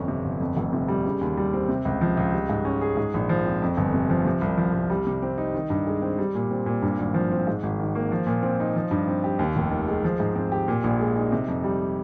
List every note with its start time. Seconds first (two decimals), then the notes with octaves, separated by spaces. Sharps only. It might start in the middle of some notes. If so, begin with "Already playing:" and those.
Already playing: G1 F2 C#4
0.08 C3
0.25 G1
0.41 F2
0.57 F1
0.73 C3
0.88 G3
1.05 C#3
1.21 D#2
1.37 G3
1.53 C4
1.69 C3
1.85 C#2
2.01 F3
2.17 C#2
2.33 G3
2.49 G#2
2.65 C#4
2.81 G#4
2.97 G#2
3.14 A#1
3.29 F3
3.46 C4
3.62 F2
3.77 G1
3.94 C3
4.09 F3
4.25 C3
4.41 C2
4.58 F3
4.74 C2
4.90 G3
5.07 C3
5.22 C4
5.38 D#4
5.55 D#3
5.70 G2
5.87 G#3
6.02 C4
6.19 G3
6.35 A#2
6.51 C4
6.66 A#2
6.82 G2
6.99 G#1
7.14 F3
7.32 C4
7.47 G#2
7.63 G#1
7.80 D#3
7.95 A#3
8.12 F3
8.27 A#2
8.43 C4
8.60 D#4
8.76 F3
8.91 G2
9.08 C4
9.24 G4
9.39 D#2
9.56 F1
9.71 D#3
9.88 G#3
10.04 F3
10.20 G#2
10.35 C4
10.52 G4
10.68 A#2
10.84 A#1
11.00 G#3
11.16 D#4
11.32 C3
11.48 F2
11.64 G3